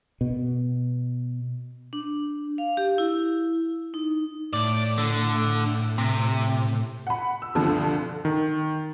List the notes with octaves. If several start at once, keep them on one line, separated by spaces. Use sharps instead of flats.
B2
D4
F5
G4
E4
D#4
A2 D5
D3
C3
F#5 B5
E6
D2 G2 B2 D3 F3 C4
D#3